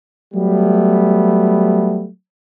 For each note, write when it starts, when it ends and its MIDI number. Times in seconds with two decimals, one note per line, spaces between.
0.35 2.08 54
0.35 2.08 55
0.35 2.08 57
0.35 2.08 59